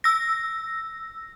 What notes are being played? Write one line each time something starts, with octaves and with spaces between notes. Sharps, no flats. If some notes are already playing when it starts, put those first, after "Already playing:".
E6 A#6